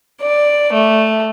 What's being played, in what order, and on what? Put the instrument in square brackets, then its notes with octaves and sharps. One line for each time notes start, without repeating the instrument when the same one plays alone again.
[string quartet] D5
A3